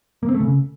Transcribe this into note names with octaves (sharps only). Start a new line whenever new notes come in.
A#3
C4
A3
C#3